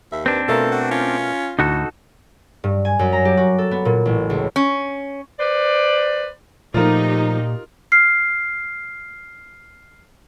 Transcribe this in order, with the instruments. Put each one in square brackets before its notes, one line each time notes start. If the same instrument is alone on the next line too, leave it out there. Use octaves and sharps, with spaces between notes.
[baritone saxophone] D#2 [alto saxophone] E5
[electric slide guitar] C4 D4 [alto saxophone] B4
[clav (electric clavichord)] B2 A3 A#4 [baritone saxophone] F4 [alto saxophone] A4
[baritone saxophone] F#4
[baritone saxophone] C#4 [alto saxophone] F4
[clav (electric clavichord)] D2 [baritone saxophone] A2 [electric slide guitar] D#4 F#4 A4
[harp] G2
G#5
F#2
A#5
G4
F#4
A4
B3
A#2
A1
C#2
[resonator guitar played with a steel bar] C#4
[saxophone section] B4 C5 D5
[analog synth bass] A#2 [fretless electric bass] F3 A3 [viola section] D#4 G4 [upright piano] F4 A#4
[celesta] F6 C7